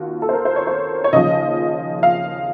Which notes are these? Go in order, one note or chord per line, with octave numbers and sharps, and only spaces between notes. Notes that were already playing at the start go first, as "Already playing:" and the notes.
Already playing: D#2 F4 F#4
A4
C5
A#4
C5
C#5
C5
C#5
D#2 C#3 F3 D#5
F5